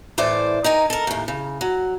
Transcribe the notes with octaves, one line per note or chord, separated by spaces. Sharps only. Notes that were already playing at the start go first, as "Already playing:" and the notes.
A2 E3 C5 D5
D#4 A#4 G#5
A4 A#4
D#2 A2
C#3
F#3